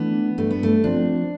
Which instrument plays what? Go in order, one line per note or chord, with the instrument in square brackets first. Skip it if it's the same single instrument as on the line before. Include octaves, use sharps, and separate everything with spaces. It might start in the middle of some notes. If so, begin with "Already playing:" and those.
Already playing: [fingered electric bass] E3 A3 D4 [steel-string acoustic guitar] B3
[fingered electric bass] G2 [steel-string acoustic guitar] A3
[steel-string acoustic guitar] B3
A3
[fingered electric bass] F3 C4 [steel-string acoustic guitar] D4